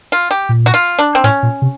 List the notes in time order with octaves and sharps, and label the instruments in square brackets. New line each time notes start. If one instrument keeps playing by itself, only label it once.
[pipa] F4
G4
[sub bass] A#2
[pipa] F#4
F4
D4
C4
[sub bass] A2 [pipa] C#4
[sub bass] A#2
C3